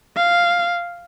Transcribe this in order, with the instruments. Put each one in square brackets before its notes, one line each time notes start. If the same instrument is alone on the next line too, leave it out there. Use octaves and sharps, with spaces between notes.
[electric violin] F5